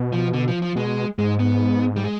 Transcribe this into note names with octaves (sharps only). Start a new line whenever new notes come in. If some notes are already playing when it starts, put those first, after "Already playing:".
Already playing: B2
F3
D3
F3
F3
B2 G#3
G#2 G#3
B3
G3
G#3